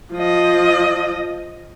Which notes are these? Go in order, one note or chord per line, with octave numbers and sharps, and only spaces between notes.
F3 D#5